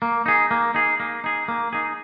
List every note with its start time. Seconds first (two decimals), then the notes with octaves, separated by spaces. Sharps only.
0.02 A#3
0.26 D#4 G#4
0.51 A#3
0.74 D#4 G#4
1.00 A#3
1.24 D#4 G#4
1.48 A#3
1.73 D#4 G#4